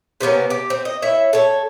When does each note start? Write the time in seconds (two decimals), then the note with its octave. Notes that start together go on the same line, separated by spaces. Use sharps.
0.21 C3 A#3 B3 C#4
0.50 G4
0.70 C4
0.85 D#5
1.02 E4 C#5 E5
1.33 A4 C#5